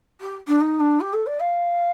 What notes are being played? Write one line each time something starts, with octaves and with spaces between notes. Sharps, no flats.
G4
D4
D#4
D4
G4
A4
D5
F5